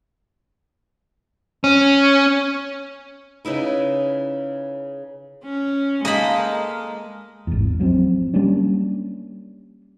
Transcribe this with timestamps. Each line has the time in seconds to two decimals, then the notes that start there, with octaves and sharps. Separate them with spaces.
1.64 C#4
3.45 C#3 D#4 E4 B4
5.44 C#4
6.05 G#3 A#3 D#4 G#4 A4 D#5 B5
6.37 A#4
7.47 G#1 E2
7.80 F3 F#3 A3 C4
8.34 G3 A#3 C#4 D4